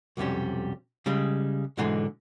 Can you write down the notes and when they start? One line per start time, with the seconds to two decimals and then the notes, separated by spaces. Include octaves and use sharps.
0.17 B1 F2 C3 G3 C#4
1.06 C#3 G3 G#3
1.77 G#2 B2 D3 E3 G#3